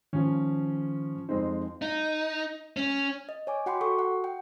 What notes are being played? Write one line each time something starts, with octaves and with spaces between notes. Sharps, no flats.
G#2 D#3 F3 C#4
F2 G#3 C4 D#4
D#4
C#4
D#5
C#5 G#5 D6
F#4 F#5 G5 B5 C6 D6
F#4 A4 C#6
F#5
G5